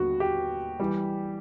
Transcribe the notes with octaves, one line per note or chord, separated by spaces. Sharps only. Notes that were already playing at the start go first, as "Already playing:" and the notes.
Already playing: D#2 D3 G3 B3 F#4
G4
E3 G3